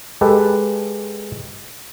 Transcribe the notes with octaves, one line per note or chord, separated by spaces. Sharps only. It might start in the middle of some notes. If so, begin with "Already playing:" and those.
G#3 G4 A4 B4